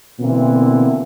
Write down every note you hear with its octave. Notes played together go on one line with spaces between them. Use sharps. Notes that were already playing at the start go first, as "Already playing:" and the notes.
B2 D3 E3 A#3 C4